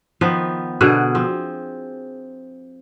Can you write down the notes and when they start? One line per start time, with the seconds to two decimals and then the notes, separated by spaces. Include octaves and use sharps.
0.21 D#3 F3 B3 B4
0.81 B2 D3 G#4 F#5
1.15 F3 C4